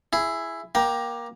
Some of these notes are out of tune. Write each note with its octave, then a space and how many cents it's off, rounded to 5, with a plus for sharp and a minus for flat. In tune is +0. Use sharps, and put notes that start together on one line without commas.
E4 +10 G#4 +0
A#3 +20 G5 +0 A#5 +15